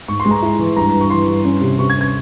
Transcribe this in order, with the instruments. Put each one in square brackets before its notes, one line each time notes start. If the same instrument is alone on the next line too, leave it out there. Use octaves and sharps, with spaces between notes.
[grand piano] G#2 C#6
C6
G#3
A#5
E4
E3
G2 A#5
G2
C#6
E3 C6
G2
C#4
C3
C3 C#6
G#6
C#4
G#6